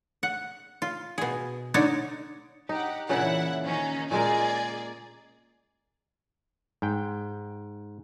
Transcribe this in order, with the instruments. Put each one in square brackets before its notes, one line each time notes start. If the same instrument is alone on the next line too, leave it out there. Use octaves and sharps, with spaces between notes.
[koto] F#5
F4
B2 G#4
D3 D4 D#4 C#5
[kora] D#4 [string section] G4 F#5
[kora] A#2 C#3 [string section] E3 E4 F#5
[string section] D#3 C#4 D#4
[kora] A#2 G#3 A#4 [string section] G#4 D5
[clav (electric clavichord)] G#2 G5